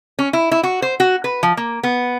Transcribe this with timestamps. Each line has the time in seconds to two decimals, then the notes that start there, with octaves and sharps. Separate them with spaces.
0.19 C#4
0.33 E4
0.52 E4
0.63 F#4
0.82 C5
1.00 F#4
1.24 B4
1.43 F3
1.57 A#3
1.83 B3